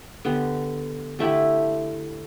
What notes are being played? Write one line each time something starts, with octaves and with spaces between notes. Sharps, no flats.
D3 B3 G4
D3 A3 E4 G4